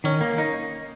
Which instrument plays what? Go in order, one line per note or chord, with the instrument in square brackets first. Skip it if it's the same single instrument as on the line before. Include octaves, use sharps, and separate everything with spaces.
[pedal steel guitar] D#3 [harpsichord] C#4
[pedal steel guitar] A#3
D#4